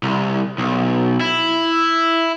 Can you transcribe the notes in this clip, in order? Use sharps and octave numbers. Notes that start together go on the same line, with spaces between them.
C2
B1
E4